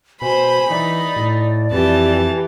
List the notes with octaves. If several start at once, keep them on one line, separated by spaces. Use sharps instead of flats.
B2 C5 G#5 B5
E3 D#4 D5
A2
F2 E3 G4 A5